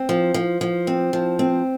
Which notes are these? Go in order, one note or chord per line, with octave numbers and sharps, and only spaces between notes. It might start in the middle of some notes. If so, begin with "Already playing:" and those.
Already playing: C4
F3
F3
F3
C4
F3
C4